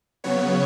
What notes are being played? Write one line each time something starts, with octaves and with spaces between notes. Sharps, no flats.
C#3 F#3 B3 C#5